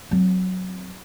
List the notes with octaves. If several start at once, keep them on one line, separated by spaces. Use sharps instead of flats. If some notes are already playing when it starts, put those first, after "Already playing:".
F#3 C4